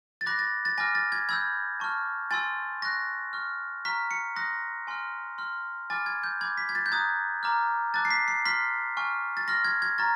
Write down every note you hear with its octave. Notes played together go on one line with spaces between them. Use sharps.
A6
B5 D6 F#6 A#6
A6
A6
G#5 B5 D6 F6 A#6
A6
G#6
B5 E6 G6 G#6
A5 C#6 F6
G#5 C6 E6 A6
C#6 F#6 A#6
C#6 F6
A#5 C#6 F6 B6
C#7
C6 D#6 F#6 A#6
G#5 C6 F6
C6 F6
G#5 B5 D6 F6 A6
G#6
G6
B5 D6 G6 G#6
B6
G#6
A6
G6
A#5 D#6 F#6 G#6
A#5 D6 F6
A5 D6 F#6 A6
C7
B6
C7
C6 F6 B6
G#5 C#6 F6
A6
C6 F6 A#6
G#6
G#6
A#5 C#6 F6 A6